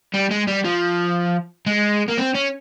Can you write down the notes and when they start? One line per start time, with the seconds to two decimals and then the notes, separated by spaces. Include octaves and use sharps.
0.14 G3
0.31 G#3
0.47 G3
0.65 F3
1.66 G#3
2.08 A#3
2.18 C4
2.35 C#4